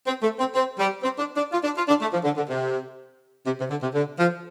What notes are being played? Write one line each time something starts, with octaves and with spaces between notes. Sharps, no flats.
C4
A3
C4
C4
G3
C4
D4
D4
F4
D4
F4
D4
A3
F3
D3
D3
C3
C3
C3
D3
C3
D3
F3